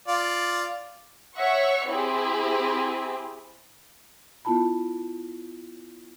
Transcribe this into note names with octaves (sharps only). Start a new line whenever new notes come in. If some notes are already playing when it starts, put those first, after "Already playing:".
F4 D5
C#5 E5 F#5 C#6
C4 E4 G4 G#4
B3 E4 F4 A5 B5